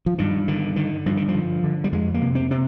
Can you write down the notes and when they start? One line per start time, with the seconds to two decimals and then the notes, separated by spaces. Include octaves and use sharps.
0.06 F3
0.18 G2 D#3
0.48 D3 D#3
0.76 D3 D#3
1.06 G2 F3
1.17 D#3
1.28 F3
1.34 D3
1.64 D3
1.84 G3
1.92 F2 G#3
2.14 A#3
2.22 C3
2.35 C4
2.50 C3 C4